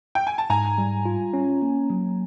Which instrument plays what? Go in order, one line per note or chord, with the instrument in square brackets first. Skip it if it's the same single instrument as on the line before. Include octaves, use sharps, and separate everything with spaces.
[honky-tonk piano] G5
G#5
A5
[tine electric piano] G#2 [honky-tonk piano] G#5 A#5
[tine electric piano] G3
F4
C#4
A#3
F#3